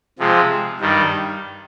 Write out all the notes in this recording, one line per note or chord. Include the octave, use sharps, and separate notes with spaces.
C3 F3 G#3
G2 D#3 G3